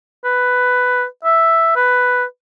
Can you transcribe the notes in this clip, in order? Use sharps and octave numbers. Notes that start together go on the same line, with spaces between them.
B4
E5
B4